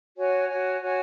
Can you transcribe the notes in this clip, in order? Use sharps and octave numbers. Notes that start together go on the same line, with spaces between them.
F#4 C#5 G#5
F#4 C#5 G#5
F#4 C#5 G#5